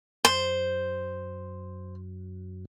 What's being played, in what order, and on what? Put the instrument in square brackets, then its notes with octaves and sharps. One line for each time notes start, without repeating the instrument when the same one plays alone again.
[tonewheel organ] F#2 [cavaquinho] C5